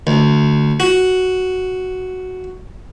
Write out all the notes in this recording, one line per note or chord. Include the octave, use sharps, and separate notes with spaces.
D2
F#4